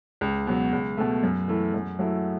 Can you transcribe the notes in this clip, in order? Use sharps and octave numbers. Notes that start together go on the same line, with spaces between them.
C#2
B2 F#3
C#2
B2 A3
F#2
E3 A3 E4
F#2
F#3 A3 E4